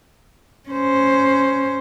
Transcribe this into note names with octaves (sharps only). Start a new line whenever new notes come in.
C#4 C5